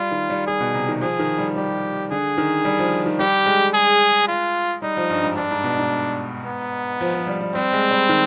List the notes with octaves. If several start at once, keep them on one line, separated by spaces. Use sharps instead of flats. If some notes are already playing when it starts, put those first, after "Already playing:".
Already playing: G3 F4
D#3
G3
G3 G#4
B2
C3
D#3
F3 G#4
D#3
G3
G3 G4
D3 G#4
D#3
G3
F3
D#3
G3 G4
G#3
G#4
F4
G3 D#4
F3
G2
G#2
G2 D4
G#2
B2
G#2
B3
F3
F3
G3
G3
G3 C4
G#3
G3
D#3